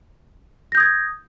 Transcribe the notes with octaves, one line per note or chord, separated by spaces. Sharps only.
D#6 G6 G#6 A#6